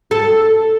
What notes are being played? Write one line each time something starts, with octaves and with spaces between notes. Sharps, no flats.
A4